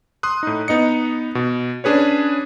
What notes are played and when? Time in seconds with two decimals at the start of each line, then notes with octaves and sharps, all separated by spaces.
0.23 C6 D#6 F#6
0.43 A2 D#4
0.68 B3 D#4 D#5 C#7
1.35 B2
1.84 C#4 D4 G#4 B4 C#5